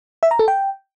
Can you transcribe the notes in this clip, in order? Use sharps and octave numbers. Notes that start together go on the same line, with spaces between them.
E5
A#5
A4
G5